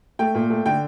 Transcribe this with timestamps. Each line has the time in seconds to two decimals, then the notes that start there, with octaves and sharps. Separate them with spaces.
0.19 A3 G5
0.35 A#2
0.50 A3
0.66 D3 G5